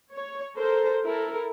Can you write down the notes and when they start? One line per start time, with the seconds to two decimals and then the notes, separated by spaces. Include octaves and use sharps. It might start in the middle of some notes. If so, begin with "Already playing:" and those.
0.15 C#5
0.56 A4 A#4 C5
1.06 E4 A4 A#4